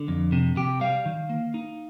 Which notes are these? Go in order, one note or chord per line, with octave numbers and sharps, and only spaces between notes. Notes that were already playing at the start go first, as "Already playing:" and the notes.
Already playing: D3
F2
C3
C3 G4
G3 F5
D#3
A#3
D#4